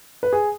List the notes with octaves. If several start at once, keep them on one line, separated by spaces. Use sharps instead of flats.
B4
G#4